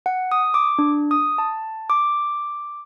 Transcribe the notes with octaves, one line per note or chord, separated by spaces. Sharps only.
F#5
D#6
D6
D4
D#6
A5
D6